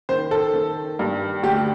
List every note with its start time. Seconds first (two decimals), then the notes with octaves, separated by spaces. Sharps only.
0.09 D#3 C5
0.31 A4
0.53 D#3
0.99 G2
1.43 D2 G4